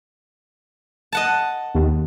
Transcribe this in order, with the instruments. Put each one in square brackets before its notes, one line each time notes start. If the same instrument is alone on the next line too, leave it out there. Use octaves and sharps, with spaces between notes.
[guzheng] D#5 F#5 A5
[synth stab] D#2